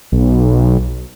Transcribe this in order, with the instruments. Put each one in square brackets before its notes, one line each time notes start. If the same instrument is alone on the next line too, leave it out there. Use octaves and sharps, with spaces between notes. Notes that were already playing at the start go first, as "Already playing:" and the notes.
[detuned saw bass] B1